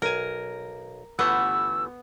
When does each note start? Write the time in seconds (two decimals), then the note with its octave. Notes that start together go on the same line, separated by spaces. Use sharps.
0.02 B1 A#4 G#5
1.19 G1 E3 A3 B3 E6